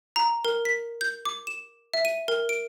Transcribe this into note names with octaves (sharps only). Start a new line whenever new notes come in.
A#5
A#4
B6
G6
D6
E7
E5
D#7
A#4
D7